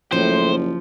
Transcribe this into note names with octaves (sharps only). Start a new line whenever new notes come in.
F#1 A2 F3 C5